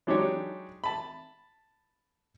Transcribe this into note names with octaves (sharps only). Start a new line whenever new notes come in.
F#3 G#3 D4 D#4 G4 C#5
A5 B5